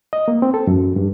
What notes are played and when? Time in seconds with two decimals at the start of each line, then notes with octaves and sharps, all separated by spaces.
0.13 D#5
0.28 A#3
0.42 C4
0.54 A4
0.67 F#2
0.96 G2